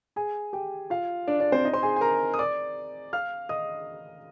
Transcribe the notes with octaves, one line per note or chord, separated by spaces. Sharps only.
G#4 G#5
G4 G5
F4 F5
D4 D5
D4 D5
C4 C5
D#4 D#5
C5 C6
G#4 G#5
G#5
A#4 A#5
D#6
D5 D6
F5 F6
D#5 D#6